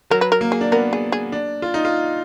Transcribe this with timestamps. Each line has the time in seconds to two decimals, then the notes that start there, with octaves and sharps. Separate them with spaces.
0.10 F#3 A#4
0.21 B4
0.32 A#4
0.41 A#3
0.52 G#4
0.61 D4
0.72 B3 A#4
0.93 G#4
1.12 G#4
1.32 D4
1.62 F4
1.74 D#4
1.85 F4